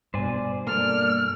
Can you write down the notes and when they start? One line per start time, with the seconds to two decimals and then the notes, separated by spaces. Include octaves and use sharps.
0.14 G2 B2 C5 D5 G#5
0.67 A#3 A4 D5 F6